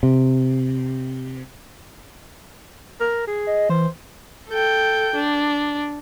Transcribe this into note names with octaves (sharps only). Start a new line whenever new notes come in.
C3
A#4
G#4
D#5
E3 C5
A4 G5
D4